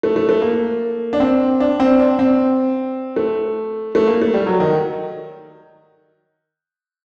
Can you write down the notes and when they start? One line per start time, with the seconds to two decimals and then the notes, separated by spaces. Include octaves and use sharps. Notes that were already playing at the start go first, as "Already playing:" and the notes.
0.03 A3
0.16 A3
0.29 A3
0.42 A#3
1.13 D4
1.20 C4
1.60 D4
1.80 C4
2.00 D4
2.19 C4
3.16 A3
3.95 A3
4.07 A#3
4.22 A3
4.34 G3
4.46 F#3
4.60 D#3